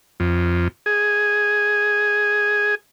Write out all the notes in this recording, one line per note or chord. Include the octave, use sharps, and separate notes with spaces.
F2
G#4